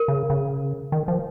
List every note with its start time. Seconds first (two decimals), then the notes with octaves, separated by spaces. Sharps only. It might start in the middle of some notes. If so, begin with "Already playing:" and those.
Already playing: A#4
0.08 C#3
0.30 C#3
0.92 D#3
1.08 F3